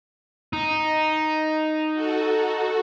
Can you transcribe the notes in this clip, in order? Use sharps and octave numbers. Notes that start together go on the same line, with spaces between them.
D#4
F#4 A4